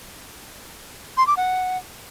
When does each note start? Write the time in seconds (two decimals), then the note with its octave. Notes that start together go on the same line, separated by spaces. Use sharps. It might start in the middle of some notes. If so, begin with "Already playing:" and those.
1.17 C6
1.27 D6
1.37 F#5